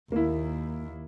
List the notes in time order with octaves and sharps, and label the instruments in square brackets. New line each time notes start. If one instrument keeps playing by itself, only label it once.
[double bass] D#2 [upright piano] A#3 E4